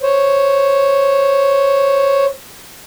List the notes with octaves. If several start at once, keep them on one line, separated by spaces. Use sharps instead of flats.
C5 C#5